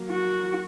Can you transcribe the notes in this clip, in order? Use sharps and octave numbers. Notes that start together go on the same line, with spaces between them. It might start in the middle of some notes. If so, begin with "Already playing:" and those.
Already playing: F#3 A#3
F#4